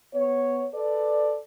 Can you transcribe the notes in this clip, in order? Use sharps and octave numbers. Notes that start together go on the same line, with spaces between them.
B3 C#5
A4 B4 D5